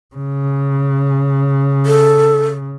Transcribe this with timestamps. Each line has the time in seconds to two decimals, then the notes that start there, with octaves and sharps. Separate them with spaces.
0.15 C#3
1.86 A4